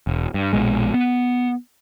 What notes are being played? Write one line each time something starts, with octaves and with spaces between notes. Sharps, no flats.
E1
G2
A#1 B2 G#3
B3